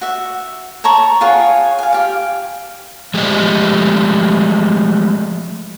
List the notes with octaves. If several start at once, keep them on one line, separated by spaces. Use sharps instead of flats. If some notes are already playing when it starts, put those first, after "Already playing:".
F#4 E5
C#5 A5 A#5 C#6
F4 G#4 C#5 F#5
F5 G#5
G4 F5
F3 G#3 A3 G4 D#5